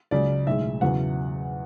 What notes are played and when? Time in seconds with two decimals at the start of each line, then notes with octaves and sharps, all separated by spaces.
0.11 C#2 C#3 F#3 D5
0.47 B1 A2 G#3 E5
0.81 E2 C#3 F#3 F#5